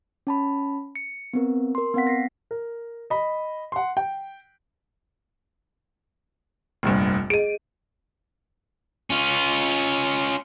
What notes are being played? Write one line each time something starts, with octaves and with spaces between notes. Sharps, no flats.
C#4 A5 B5
C#7
B3 C4 A#4
A#4 C6
B3 C4 F5 F#5 B6
A#6 C7
A#4
D#5 B5
F#5 C6
G5
F1 A#1 G2
G#4 D#5 D7 D#7
C#4 F4